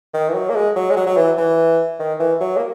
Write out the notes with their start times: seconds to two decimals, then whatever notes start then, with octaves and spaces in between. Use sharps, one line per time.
0.14 D#3
0.29 E3
0.34 F#3
0.50 A#3
0.56 G#3
0.76 F#3
0.91 G#3
0.97 F#3
1.07 F#3
1.17 E3
1.38 E3
2.00 D#3
2.20 E3
2.41 F#3
2.57 A#3